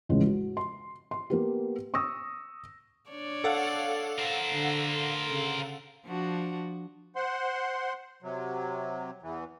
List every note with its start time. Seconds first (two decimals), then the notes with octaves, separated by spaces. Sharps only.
0.09 A1 E2 C#3 F3 G#3
0.26 F#4
0.57 C6
1.11 C6
1.30 A#3 B3 G4
1.94 C#6 D#6 E6 A#6
3.10 D4 C#5 D5
3.44 A4 F5 F#5
4.18 A#4 C5
4.54 D3
5.30 C#3
6.05 F3 D4 F#4
7.16 C5 F#5 C6
8.23 C3 F#3
9.22 E2 E3